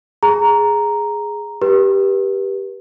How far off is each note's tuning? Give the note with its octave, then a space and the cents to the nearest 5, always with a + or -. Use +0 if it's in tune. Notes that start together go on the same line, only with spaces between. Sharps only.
G#4 +0 A#5 +0
G4 +0 B4 -35